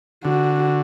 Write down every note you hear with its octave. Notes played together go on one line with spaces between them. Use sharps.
D3 F#4